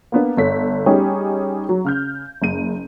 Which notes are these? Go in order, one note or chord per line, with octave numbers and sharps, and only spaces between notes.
A#3 B3 D4
G1 A4 C#5 B6
G3 C#4 D#4 G4 G#4
F#3
C#3 F6 G6
F#1 D#7